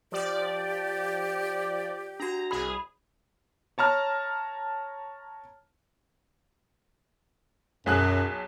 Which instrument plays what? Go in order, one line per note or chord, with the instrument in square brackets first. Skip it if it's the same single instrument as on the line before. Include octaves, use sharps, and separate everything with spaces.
[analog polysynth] F3 D5 [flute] G4
[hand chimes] D4 F#4 [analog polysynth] A#5
[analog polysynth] C2 G#4 [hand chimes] B5
[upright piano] C#5 A5 A#5 F6
[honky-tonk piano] B1 G#4 F#6 [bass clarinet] F#2